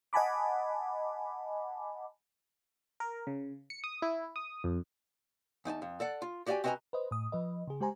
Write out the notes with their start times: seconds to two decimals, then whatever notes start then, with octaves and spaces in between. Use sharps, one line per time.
0.13 D#5 F#5 G#5 A5 B5 D6
3.00 A#4
3.27 C#3
3.70 C#7
3.84 D#6
4.02 E4
4.36 D#6
4.64 F2
5.65 E2 D#4 G#5 A5
5.82 F2
6.00 A4 D5 F#5
6.22 F4
6.46 F#4 G4 D5 F5 G5 G#5
6.64 C4 F#4 B4 D#5 G#5 A#5
6.93 B4 C5 D#5
7.11 A2 D#6
7.32 F3 B4 D#5
7.67 C#3 G#4
7.80 G#3 G4 C5 G#5 A#5